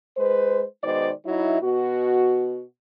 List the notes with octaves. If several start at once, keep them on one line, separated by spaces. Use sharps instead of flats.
G#3 B4 C5
B2 D#3 G#3 C5 D5
F#3 D#4 E4
B2 F#4